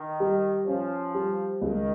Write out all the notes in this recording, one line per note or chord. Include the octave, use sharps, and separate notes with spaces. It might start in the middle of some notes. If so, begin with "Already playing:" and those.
Already playing: D#3
G3
F3 C#4
G3
C#2 D#3